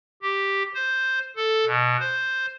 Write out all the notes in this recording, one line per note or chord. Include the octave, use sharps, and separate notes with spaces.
G4
C5
A4
B2
C5